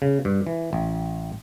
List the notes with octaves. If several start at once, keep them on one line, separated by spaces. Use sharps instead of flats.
C#3
G2
E3
A1